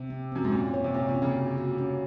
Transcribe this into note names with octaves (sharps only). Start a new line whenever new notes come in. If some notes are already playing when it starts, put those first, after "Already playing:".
Already playing: C3
C4
F#2 C4
G#2
A#2 C#4
C#5
C3
A#2 C#5
C3
C#4
C#3
F#4
F#4
C#4